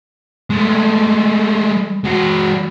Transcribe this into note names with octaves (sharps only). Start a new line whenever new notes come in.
G#3 A3
G#3 F#4